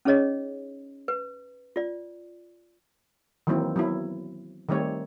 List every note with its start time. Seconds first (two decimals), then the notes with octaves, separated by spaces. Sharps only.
0.05 C#4 D#4 G#4 C#5 D#5
1.08 B4
1.76 F4 D5
3.47 D#3 E3 F#3 A#3 C4 E4
3.76 F#3 B3 E4
4.69 D#3 G3 A3 C4 C#5